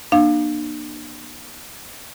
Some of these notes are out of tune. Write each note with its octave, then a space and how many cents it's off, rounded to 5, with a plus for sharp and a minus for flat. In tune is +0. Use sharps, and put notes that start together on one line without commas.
A#3 +35 D4 +40 F5 +5